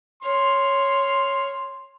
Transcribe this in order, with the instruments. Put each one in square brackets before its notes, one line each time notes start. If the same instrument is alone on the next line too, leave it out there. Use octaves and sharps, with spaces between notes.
[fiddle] C#5 F6 [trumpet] C6